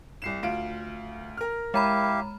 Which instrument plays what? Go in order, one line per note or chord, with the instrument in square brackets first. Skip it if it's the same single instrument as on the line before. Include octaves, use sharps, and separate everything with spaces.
[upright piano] C2 C7 E7
D2 F4 D7
A#4 F6
[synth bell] G#3 A#5 B5 [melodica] E4 G4 F5